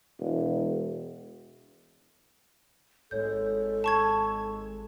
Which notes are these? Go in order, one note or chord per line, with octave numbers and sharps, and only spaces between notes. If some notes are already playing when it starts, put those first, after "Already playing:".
E1
G#1 G#3 A4 C#5 G6
A5 C#6 G#6